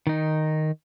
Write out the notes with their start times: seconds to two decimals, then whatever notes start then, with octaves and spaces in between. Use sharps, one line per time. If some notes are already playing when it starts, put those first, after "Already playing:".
0.07 D#3 D#4